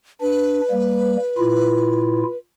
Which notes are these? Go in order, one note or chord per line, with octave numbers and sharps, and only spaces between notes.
D4 B4
G3 A#3
A#2 E4 F4